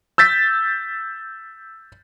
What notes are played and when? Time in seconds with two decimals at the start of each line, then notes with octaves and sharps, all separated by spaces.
0.18 E6 G6 A6 B6